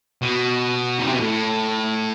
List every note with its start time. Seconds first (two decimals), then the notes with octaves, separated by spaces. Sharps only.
0.22 B2
0.99 D#3
1.06 C3
1.14 B2
1.20 A2